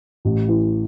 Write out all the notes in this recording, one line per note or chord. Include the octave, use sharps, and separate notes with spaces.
A1
E3